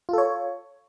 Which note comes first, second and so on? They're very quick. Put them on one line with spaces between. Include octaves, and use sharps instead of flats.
F4 A4 C#5